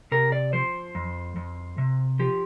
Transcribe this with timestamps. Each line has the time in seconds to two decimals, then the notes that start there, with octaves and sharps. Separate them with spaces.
0.12 C3 A#4
0.32 D5
0.53 F3 C5
0.95 F2
1.36 F2
1.78 C3
2.19 F3 G4